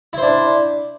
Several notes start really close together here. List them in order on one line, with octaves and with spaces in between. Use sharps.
E4 C5 D4